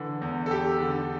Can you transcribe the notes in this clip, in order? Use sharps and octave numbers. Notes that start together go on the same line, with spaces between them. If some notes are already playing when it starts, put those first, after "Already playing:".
Already playing: D3 E3
E2
A4
E2 G4
D3